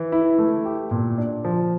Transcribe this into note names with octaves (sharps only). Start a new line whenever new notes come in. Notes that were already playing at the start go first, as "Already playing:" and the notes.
Already playing: E3
E4
A3
G4
A#2
D4
F3